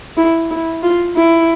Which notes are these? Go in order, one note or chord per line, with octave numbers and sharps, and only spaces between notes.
E4
E4
F4
E4